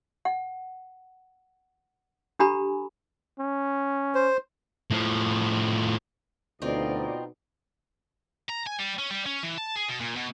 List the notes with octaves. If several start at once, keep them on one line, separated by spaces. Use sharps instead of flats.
F#5
D4 G4 A4 G#5 A#5 B5
C#4
C5
A2 F3
D2 B2 C4 D#4 F4 D5 D#5
A#5
G#5
G3
C#4
G3
C#4
E3
A5
G#4
B2
A#2
B2